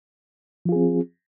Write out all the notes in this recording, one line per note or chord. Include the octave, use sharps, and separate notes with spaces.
F3 C4 F4 G#4